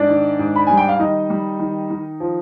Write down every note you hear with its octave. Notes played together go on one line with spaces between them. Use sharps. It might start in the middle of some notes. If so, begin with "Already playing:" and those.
Already playing: G#2 D4 D5
D#3
G#2
B5
G3 G#5
G5
F5
D#3 D#4 D#5
G3
D#3
D#3
F3